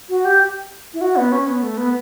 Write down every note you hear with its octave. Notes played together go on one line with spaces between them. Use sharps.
F#4
G4
E4
F#4
B3
C#4
B3
A3
B3